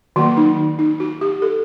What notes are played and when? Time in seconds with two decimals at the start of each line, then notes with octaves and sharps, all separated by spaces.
0.16 D#3 F#3 A#3 F#4
0.37 D#4
0.79 D#4
1.00 F#4
1.21 G4
1.42 A4